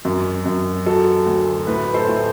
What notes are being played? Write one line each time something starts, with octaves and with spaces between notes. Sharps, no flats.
F#2
F#2
F#3 A4
D2
A2 B4
A4 C5
A2